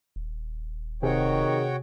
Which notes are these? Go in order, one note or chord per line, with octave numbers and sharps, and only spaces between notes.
D#1
C3 D#3 F#4 G#4 C#5 G5